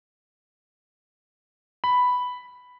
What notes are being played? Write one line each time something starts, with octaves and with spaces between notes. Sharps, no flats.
B5